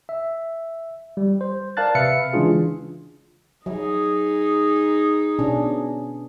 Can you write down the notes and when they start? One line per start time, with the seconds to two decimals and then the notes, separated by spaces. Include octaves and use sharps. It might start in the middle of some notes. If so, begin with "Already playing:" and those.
0.09 E5
1.17 G3
1.41 C5
1.77 A#4 D5 F5 A5 F#6 A6
1.95 C3 B4 E5 F5 C#7
2.33 C#3 E3 G#3 D4 F4 G#4
3.66 F#3 D#4 G#4
5.39 B2 C#4 D4